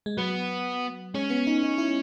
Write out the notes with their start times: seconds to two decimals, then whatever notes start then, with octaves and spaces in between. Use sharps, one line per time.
0.06 G#3
0.17 F#3 B3
1.14 G#3 C#4
1.30 B3
1.47 D#4
1.63 D#4
1.78 E4